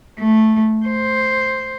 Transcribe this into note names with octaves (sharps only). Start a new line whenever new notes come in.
A3
C5